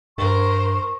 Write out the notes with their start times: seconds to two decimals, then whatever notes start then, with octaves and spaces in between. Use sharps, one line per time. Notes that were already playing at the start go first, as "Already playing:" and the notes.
0.18 G2 A#4 C5 C#6